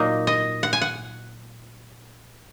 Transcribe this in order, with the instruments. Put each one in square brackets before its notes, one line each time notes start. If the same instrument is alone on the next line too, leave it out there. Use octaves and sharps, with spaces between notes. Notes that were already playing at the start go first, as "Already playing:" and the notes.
Already playing: [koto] A#2 F#3 A#3 D#4 D#5
D#5
F#5
G#5
F#5